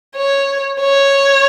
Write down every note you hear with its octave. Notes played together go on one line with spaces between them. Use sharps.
C#5
C#5